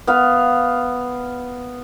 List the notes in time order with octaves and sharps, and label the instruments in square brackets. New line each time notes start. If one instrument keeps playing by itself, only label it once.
[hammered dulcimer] B3 F5